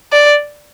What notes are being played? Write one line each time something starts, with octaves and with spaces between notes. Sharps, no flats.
D5